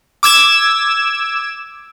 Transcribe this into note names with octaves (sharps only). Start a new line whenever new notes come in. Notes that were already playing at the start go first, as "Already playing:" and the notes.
D6 E6 G#6 E7